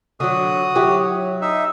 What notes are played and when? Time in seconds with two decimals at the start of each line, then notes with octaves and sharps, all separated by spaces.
0.20 D3 F#3 F#4 D#6
0.75 F#3 E4 G4
1.41 D#4 E5